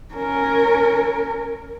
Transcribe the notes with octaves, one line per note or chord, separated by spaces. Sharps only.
C#4 A#4